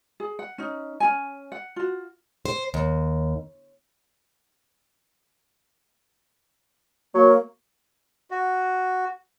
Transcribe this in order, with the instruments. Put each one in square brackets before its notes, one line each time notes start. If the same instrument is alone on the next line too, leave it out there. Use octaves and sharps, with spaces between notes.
[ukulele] G#4
F#5
C#4 D#4
C#4 D#4 G#5
F#5
F4 F#4
[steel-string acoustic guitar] C5
D#2
[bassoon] F#3 [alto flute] A#3
[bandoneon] F#4